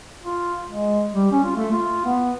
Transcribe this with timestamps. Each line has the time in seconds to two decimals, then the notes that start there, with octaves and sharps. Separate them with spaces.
0.24 F4
0.68 G#3
1.14 G3
1.32 C#4
1.44 F4
1.56 A3
1.72 F4
2.05 B3